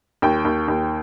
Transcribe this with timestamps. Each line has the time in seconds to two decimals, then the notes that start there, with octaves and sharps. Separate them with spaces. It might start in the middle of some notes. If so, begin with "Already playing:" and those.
0.22 D#2 G5
0.45 D#2
0.68 D#2